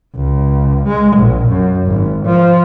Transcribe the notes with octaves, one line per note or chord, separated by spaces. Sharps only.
C#2
G#3
A#1
F#2
G#1
F3